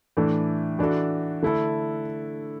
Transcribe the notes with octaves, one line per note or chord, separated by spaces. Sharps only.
A2 E3 D4 A4
E3 D4 F#4 A4
D3 A3 E4 A4